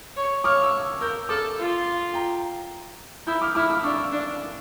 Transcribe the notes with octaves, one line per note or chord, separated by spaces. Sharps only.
C#5
C#5 D6 F6
C#6 E6
A#4 E6 G6
A4 D6 F6
F4
G5 A#5
E4 E6 G6
D6 F6
E4 D6 F6
D6 F6
D4 C#6 E6
D4